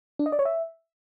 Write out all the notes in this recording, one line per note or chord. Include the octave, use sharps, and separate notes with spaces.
D4
D#5
D5
C#5
E5